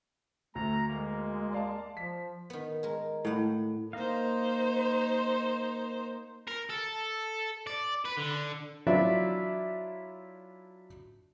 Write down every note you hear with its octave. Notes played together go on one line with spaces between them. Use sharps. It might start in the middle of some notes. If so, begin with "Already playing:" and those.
D2 A3 A#5
G#3 A#3
D5 F5 A5
F3 B6
D#3 B3
G#3 A#4
A2 F5 F#5
A#3 D#4 C5 D#5 F5
A#4
A4
D5
B4
D3
F#3 D4 E4 F4 D5 E5